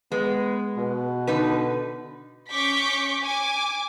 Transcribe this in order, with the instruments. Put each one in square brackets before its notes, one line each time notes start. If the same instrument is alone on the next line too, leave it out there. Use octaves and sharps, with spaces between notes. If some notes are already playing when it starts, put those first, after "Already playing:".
[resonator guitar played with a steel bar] G#3 [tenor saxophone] B3
[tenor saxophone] B2
[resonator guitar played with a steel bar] D3 D#4 B4
[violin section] C#4 C#6 D6 G6 B6
G#5 D6